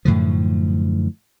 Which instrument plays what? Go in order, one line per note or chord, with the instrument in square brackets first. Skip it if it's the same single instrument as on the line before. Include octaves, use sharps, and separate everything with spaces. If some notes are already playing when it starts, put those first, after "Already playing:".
[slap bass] F#2 A2 D3 F3